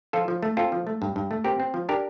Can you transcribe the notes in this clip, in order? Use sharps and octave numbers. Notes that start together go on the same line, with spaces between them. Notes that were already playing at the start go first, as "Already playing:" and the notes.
F3 F4 A4
F3
A3
C4 F4 A4
F3
A3
G2
G2
A3
C4 G4 A#4
C4
F3
D4 G4 A#4